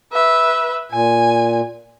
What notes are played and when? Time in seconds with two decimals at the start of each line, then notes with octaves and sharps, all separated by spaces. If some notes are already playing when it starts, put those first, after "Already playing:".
0.12 B4 E5
0.92 A#2 G#5